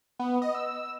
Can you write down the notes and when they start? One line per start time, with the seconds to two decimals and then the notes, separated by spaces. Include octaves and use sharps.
0.19 B3
0.42 D#5
0.55 E6